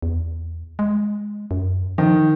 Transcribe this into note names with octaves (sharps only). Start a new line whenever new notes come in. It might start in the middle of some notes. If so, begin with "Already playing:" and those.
E2
G#3
F#2
D#3 F3